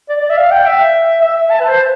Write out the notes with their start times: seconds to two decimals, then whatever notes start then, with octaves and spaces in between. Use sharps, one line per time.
0.09 D5
0.21 D5
0.30 E5
0.37 F5
0.51 G5
0.66 E5
1.22 E5
1.50 A5
1.60 B4
1.68 C5